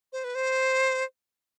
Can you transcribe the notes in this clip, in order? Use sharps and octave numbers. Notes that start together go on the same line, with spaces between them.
C5
B4
C5